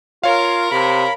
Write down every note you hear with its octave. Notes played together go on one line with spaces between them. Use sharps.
F4 A#4 C#5 F5
C3 B5